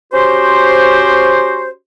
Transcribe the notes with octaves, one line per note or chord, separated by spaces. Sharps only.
C#4 F#4 G4 C5